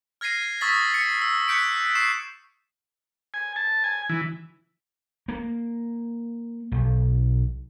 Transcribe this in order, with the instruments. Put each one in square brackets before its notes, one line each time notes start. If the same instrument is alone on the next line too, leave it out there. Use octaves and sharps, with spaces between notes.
[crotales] F6 G#6 A#6 C7 D#7
C#6 D#6 E6 A6 B6
A6 C#7
E6
D6 F#6 G6 B6 C#7 D7
C#6 C7 E7
[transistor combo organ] G#5
A5
G#5
E3
[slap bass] A#3
B1